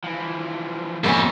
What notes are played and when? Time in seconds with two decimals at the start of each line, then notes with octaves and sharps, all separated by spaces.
0.04 E3 F3
1.04 F2 A#3 B3 C#4 E5